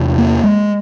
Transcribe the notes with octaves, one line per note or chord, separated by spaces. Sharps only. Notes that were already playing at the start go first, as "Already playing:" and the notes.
Already playing: E2 C3
A#3
G#3